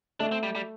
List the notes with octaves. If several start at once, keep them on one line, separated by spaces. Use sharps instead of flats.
A3 D4
C4
G3
G3